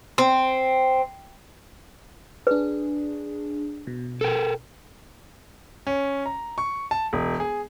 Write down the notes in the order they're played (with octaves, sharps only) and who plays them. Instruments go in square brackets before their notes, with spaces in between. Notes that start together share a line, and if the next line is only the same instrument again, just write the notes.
[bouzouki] C4
[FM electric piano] D4 G#4 [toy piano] B4
[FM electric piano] B2
[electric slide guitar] A4 A#4 G5
[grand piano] C#4
A#5
C#6
A5
E1
G#4